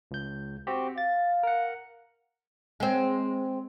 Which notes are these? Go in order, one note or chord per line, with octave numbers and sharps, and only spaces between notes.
C#2 G6
C4 F#4 G4
F5 A6
A#4 F#5
G#3 C4